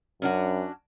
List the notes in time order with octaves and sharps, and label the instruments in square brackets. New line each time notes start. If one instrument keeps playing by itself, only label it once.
[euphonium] F#2 [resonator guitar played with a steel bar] C#4 D4 F#4